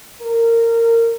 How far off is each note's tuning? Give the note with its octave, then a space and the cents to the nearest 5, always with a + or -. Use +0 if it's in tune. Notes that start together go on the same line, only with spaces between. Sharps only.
A#4 -20